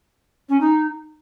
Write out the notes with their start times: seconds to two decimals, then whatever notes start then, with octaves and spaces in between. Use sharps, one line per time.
0.49 C#4
0.61 D#4